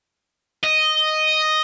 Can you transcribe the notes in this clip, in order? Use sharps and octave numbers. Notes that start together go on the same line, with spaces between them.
D#5